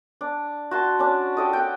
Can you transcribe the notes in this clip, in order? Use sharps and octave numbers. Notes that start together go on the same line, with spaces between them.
D4
F#4 A5 C6
C#4 D4
G4 A4 D#5
F#5 G5